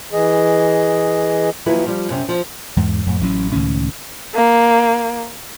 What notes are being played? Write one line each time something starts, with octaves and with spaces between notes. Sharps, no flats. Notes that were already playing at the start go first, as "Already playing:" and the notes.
E3 G#4 D#5
D#2 F3 F#3 E4 G#4 B4
F3 G3
F#2 C3 C#4
F3
E2 G#2
F2 A2
A1 F#3 C#4
C#2 A2 D#3 C#4
A#3